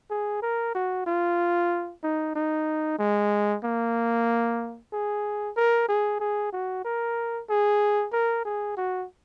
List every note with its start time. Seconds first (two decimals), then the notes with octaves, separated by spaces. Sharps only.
0.10 G#4
0.43 A#4
0.75 F#4
1.07 F4
2.03 D#4
2.36 D#4
2.99 G#3
3.64 A#3
4.93 G#4
5.56 A#4
5.89 G#4
6.20 G#4
6.52 F#4
6.85 A#4
7.49 G#4
8.13 A#4
8.45 G#4
8.77 F#4